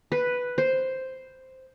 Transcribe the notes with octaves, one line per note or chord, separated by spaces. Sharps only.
B4
C5